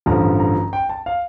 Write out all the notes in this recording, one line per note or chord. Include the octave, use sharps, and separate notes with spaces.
A1 G2 D3 F3 A#5
A#5
G5
A5
F5